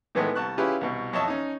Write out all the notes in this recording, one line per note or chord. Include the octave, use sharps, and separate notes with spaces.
A2 D#3 E3 G#3 A3 B3
C2 A5 C#6 F#6
C#4 E4 F4 G4 G#4 B4
C2 B2
F2 C#5 D#5 E5 A5 C#6
C#4 D#4